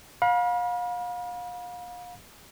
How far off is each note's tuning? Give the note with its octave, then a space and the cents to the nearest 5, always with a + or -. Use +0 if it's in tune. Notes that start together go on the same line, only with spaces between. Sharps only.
F5 +35 B5 -35